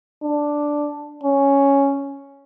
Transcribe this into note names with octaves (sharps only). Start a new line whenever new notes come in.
D4
C#4